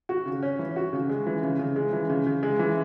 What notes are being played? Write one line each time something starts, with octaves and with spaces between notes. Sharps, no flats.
F#4
C#3
C#4
E3
F#4
C#3
G#3
E3
C#3
C#3
G#3
E3
C#3
C#3
G#3
E3